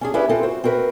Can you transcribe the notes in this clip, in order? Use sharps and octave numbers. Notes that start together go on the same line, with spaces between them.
C#4 D4 G#4
C#4 E4 G4 B4 D5
C4 F4 A4 A#4
F#4 C5
C4 F#4 A#4 B4